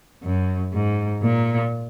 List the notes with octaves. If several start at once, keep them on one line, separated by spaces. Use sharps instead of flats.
F#2
G#2
A#2